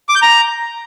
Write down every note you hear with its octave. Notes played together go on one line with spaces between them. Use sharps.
D6
G6
A#5